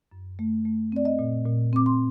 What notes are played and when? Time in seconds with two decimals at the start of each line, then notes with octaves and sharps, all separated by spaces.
0.12 F#2
0.39 A3
0.65 A3
0.92 C4 D5
1.05 D#5
1.19 A#2
1.46 A#2
1.73 C4 D6
1.86 C6